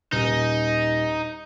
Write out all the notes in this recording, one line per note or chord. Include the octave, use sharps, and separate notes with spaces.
D#1 D#4